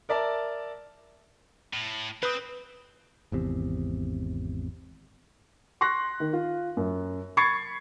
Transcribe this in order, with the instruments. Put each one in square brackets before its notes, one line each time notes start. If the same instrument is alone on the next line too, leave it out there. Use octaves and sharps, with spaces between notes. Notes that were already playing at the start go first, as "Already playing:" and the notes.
[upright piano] A#4 D5 E5 A5
[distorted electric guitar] A2
[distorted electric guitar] C4 [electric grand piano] B4 D#6
[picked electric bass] G#1 E2 C3
[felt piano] C6 C#6 F#6 A#6
D#3
F4
F#2
B5 C#6 G#6 A6 C7 C#7